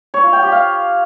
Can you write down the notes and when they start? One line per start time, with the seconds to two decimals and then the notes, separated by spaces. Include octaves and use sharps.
0.14 C#5
0.23 F4
0.33 G5
0.42 G4
0.52 F5